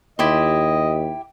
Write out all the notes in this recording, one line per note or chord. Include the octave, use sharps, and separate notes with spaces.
D#2 E4 G4 D#5 C6